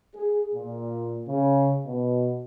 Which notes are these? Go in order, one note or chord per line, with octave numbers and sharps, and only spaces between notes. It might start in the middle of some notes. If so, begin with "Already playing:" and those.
G#4
A#2
C#3
B2